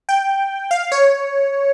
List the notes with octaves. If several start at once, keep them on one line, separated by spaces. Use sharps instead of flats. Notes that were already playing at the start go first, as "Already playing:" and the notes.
G5
F5
C#5